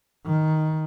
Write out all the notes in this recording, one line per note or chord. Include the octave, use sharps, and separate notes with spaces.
D#3